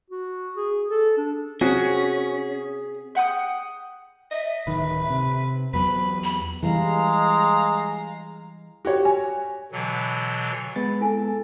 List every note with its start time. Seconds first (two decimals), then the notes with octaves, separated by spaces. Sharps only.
0.10 F#4
0.57 G#4
0.89 A4
1.17 D4
1.61 C4 C#4 F#4 G#4
3.15 E5 F#5 G5 D#6
4.31 D#5 E5
4.67 D1 D#3 B4
5.10 C3
5.74 E2 F#3 B3 B4 B5
6.24 B5
6.63 E3 G3 G#3 F5 A#5
8.85 F#4 G4 C#5
9.05 G#5
9.72 B2 D3 E3 F#3
10.76 G#3 B3 B4 A6
11.01 E4 A4 G#5